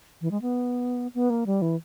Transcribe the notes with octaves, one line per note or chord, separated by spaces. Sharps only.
E3
G#3
B3
B3
A#3
G3
E3